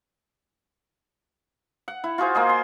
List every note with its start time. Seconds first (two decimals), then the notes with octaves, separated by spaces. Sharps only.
1.88 F#5
2.04 E4
2.18 F4 F#4 G#4 C5
2.35 A#3 G#4 D#5
2.49 C6